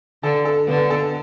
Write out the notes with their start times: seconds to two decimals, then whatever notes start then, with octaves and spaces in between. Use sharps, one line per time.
0.23 D3 A4
0.45 A4
0.68 D3 B3
0.90 A4